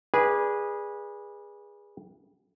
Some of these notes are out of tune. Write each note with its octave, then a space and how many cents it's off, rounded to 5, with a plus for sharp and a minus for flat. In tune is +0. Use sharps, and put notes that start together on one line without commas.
G#4 -15 B4 -25 D5 +0